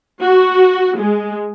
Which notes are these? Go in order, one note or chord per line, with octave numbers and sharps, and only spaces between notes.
F#4
G#3